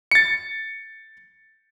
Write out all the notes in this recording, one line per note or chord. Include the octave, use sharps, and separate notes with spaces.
A6 C#7